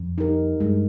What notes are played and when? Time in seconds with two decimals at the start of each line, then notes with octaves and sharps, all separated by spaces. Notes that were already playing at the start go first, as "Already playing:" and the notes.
Already playing: F2
0.18 D#4 G4 A#4
0.60 G2 G#3